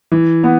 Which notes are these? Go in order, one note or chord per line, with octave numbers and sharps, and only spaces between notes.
E3
B3